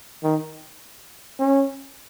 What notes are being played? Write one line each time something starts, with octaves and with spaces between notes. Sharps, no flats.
D#3
C#4